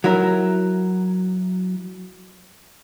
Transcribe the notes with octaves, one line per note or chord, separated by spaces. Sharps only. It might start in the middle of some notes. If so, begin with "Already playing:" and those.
F#3 E4 A#4